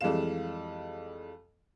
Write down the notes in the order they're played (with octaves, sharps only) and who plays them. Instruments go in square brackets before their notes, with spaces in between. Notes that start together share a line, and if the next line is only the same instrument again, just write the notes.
[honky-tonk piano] F2 E3 G3 G#3 F5 E7